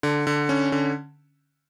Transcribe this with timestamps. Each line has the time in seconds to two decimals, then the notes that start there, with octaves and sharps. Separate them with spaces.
0.03 D3
0.27 D3
0.49 C#4
0.72 D3